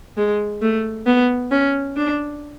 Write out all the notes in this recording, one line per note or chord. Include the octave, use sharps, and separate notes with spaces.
G#3
A3
B3
C#4
D4